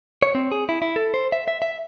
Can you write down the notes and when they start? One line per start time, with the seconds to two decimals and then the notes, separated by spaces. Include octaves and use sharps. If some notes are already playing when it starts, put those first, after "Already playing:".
0.23 C#5
0.35 C4
0.52 G#4
0.69 E4
0.82 E4
0.96 A4
1.14 C5
1.32 E5
1.48 E5
1.62 E5